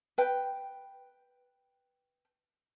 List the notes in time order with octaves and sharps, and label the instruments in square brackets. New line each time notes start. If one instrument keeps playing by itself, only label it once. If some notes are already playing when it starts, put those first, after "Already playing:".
[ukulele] B4 G5